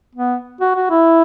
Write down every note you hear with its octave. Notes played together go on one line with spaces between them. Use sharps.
B3
F#4
F#4
E4